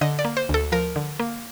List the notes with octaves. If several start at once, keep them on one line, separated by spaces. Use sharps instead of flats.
D3 D#5
D5
A#3
C5
D2 A4
F3 A#4
D3
A#3